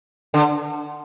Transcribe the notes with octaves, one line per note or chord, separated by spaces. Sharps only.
D3